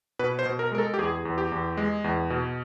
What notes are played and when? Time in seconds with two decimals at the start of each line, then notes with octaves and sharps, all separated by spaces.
0.19 B2 B4
0.39 C5
0.46 B2
0.59 A#4
0.72 G#3 A#4
0.78 A4
0.94 G4
0.99 E2 G#4
1.25 E2
1.38 G4
1.52 E2
1.77 G#3
2.04 E2
2.30 B2